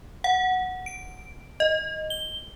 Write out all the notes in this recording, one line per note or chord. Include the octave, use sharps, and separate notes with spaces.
F#5
D7
D#5
G7